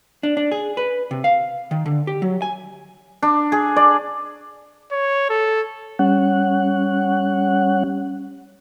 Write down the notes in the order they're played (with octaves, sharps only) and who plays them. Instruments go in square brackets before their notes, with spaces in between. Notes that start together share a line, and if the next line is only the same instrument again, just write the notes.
[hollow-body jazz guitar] D4
D4
G#4
B4
C3
F5
D#3
D3
G4
F#3
G#5
[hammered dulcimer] D4
G#4
D5
[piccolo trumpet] C#5
A4
[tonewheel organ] G3 C#4 F#5